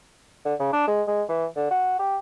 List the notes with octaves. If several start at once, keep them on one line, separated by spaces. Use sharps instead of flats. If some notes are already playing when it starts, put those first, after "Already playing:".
D3
C#3
D4
G#3
G#3
E3
D3
F#4
G4